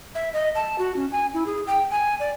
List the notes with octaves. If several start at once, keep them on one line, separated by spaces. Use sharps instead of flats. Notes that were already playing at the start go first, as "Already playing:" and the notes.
E5
D#5
A5
F#4
C#4
G#5
E4
G#4
G5
G#5
D5